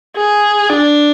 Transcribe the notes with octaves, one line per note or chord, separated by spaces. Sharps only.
G#4
D4